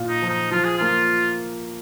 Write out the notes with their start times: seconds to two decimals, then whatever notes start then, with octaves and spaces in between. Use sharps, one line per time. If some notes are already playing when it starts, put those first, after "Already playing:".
Already playing: A#2 F4
0.09 D#4
0.22 F3
0.29 D#4
0.51 F3 F4
0.64 G#4
0.78 A#3 F4